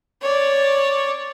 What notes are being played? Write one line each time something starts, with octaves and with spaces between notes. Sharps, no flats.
C#5 D5